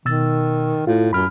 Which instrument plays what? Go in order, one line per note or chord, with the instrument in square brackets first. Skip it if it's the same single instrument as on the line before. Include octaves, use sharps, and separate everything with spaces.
[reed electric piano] B2 E6 A6 [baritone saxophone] D#3
[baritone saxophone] A2 [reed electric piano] F4
[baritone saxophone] F#2 [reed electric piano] B5 F6